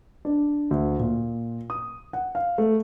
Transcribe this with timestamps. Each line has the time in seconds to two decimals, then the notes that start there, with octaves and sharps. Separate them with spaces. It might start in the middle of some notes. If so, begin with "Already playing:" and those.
0.25 D4
0.71 D2
0.99 A#2
1.70 D#6
2.13 F#5
2.35 F5
2.58 A3